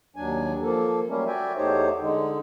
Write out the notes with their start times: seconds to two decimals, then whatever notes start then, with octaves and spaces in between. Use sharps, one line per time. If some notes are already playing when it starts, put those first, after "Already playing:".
0.16 D#2 F#3 D4 G#5
0.62 F3 A#3 A4
1.08 F#3 G3 A3 A#3 C#4
1.27 F#4 D5 E5 G5 G#5
1.57 E2 A3 D#4 G4 C5 C#5
2.01 D3 G#3 D#4